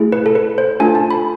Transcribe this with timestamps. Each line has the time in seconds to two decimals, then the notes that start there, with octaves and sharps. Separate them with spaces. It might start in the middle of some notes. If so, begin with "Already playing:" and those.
Already playing: A3 E4 G#4
0.12 B4
0.26 A4
0.35 B4
0.58 C5
0.80 A3 D4 F4 A4 G#5
0.95 A5
1.11 B5